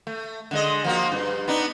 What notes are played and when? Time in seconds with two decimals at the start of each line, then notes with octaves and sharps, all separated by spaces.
0.07 A3
0.51 D3 G#3 D#5
0.84 F3 A#3 F#4
1.12 G2
1.48 B3 D4 D#4